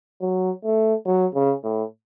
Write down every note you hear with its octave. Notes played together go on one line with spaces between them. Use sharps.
F#3
A3
F#3
C#3
A2